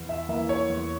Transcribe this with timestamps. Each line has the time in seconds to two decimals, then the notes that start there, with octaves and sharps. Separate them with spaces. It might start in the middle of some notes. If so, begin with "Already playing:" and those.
Already playing: E2
0.09 E5
0.29 E3 A#3 E5
0.49 C#5
0.69 E2